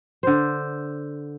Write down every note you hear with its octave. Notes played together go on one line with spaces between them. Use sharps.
D3 C5